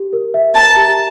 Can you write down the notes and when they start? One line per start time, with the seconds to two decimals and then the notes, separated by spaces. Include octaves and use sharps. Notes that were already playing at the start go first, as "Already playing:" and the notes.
Already playing: G4
0.13 A#4
0.34 E5
0.55 A5 A#5
0.76 G4